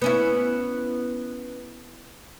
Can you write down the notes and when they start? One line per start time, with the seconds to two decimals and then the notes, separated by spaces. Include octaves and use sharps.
0.02 B3 C#4 E4